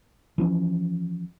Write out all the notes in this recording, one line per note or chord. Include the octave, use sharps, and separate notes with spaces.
E3 F3 C#4